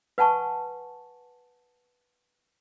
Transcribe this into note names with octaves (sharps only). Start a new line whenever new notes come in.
B4 F#5 G#5 A5 C#6